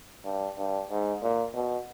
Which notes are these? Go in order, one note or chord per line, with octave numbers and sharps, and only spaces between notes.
G2
G2
G#2
A#2
B2